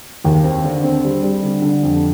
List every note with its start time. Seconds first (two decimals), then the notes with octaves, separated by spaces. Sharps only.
0.24 D#2
0.44 C4
0.64 D3
0.84 C4
1.04 G3
1.23 G3
1.43 D3
1.62 D3
1.83 F2